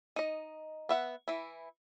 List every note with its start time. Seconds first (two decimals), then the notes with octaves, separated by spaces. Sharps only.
0.16 D#4 D#5
0.89 B3 E5 F#5
1.28 E3 E4